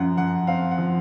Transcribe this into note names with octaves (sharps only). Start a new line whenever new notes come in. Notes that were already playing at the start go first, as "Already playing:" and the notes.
Already playing: F#2 F3 F#5
F#2 F#5
C4 F5
F#5
F3